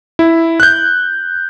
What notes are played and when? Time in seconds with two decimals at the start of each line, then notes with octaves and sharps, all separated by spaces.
0.19 E4
0.60 F#6 G6